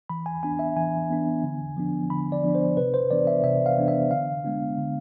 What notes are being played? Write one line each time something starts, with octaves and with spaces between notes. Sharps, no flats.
E3 B5
G#5
B3 D4 G#5
E5
E3 G#5
B3 D4
D3
F3 B3 D4
D3 B5
D5
F3 B3 D4
C5
C3 B4
C5
E3 B3 D4 D5
E5
C3 E5
F5
E3 B3 D4
E5
D3 F5
G#3 B3 D4
D3